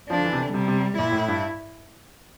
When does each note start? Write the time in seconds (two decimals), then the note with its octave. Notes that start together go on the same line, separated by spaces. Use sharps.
0.09 F3 D4
0.17 D3
0.25 E3
0.33 C3
0.39 D3
0.53 C3 G3
0.68 C3
0.98 A#2 E4
1.12 A2
1.28 G2